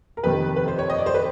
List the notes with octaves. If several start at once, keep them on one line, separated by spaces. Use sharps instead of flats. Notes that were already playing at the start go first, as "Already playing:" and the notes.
A#4
F2 C3 D#3 B4
B4
C5
C#5
D#5
D5
C5
B4